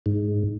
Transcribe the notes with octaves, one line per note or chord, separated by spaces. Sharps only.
G#2